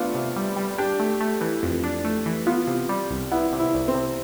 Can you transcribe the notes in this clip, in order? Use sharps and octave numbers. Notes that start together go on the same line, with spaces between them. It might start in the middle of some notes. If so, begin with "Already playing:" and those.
Already playing: A3 B3 D4 F4
C3
G3
G3
D4 G4
A3
A3
E3
F2
D4
A3
E3
B3 F4
C3
G3
C2
B3 E4
C3
E4
C2
C4
C3